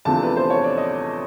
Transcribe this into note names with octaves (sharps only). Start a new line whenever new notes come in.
E2 C3 F3 A3 D4 A5
B4
C5
C#5
D5
D#5